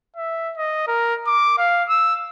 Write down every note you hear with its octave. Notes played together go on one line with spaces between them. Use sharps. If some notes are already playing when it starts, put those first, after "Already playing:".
E5
D#5
A#4
D6
F5
E6